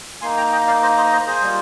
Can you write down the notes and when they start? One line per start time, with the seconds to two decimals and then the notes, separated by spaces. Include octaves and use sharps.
0.21 A#3 D#4 G#5 C6
0.37 G5 A#5
0.52 D#5 G5
0.67 D5 F5
0.82 C5 D#5
0.97 C5 D#5
1.12 C5 D#5
1.27 G#4 C5
1.42 G3 A#3 F4